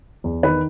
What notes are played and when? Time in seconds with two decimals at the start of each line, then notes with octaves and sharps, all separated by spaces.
0.24 E2
0.43 D#3 B4